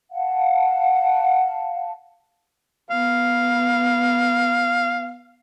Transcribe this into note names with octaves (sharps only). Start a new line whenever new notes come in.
F5 F#5 A5
B3 F5